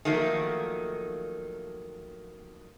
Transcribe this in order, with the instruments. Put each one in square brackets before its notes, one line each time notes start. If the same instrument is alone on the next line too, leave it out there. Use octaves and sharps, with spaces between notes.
[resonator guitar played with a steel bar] D#3 F3 F#3 A3 A#3